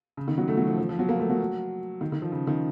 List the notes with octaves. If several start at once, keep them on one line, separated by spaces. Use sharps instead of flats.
C#3
D#3
F#3
A3
F#3
F3
F3
F3
F#3
A#3
A3
F#3
D#3
D#3
F3
C#3
D#3